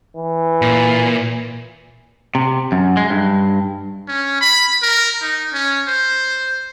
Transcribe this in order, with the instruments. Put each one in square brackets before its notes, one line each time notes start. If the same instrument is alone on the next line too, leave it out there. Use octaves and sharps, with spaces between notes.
[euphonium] E3
[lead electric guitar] A#2
[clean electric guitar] C3
F#2
G#3
G2
[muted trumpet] C#4
B5
A#4
D#4
C#4
C5